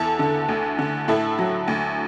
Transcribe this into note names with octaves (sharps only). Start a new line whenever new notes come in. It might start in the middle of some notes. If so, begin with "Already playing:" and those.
Already playing: E2 E4 A4
D3
D2
D3
A2 E4 A4
F#3
D2